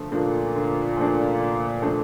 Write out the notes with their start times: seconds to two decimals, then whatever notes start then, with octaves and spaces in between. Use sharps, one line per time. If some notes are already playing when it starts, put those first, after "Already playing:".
Already playing: D3 F3 A3
0.12 A#2 F3 A3 D4
0.55 D3
0.97 F3 A3 D4
1.39 D3
1.82 F3 A3 D4